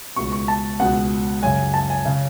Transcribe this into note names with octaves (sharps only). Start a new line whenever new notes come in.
C#2 B2 C#6
C#6
A5
C#2 B2 F#5
F#2 C#3 G#5
A5
G#5
C#3